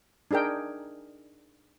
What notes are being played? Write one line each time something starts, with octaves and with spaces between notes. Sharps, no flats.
D4 D#4 G#4 A#4 G5